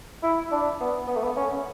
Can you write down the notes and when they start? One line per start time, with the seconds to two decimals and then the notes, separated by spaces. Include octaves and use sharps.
0.23 E4
0.52 D4
0.80 B3
1.08 B3
1.16 A3
1.23 B3
1.37 C#4